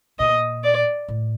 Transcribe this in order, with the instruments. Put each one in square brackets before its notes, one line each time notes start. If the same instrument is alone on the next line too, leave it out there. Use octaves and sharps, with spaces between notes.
[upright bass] A#2 [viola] D#5
[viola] D5
[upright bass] A2